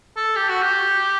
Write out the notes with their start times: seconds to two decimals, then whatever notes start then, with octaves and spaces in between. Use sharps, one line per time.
0.17 A4
0.36 G4
0.49 F#4
0.62 G4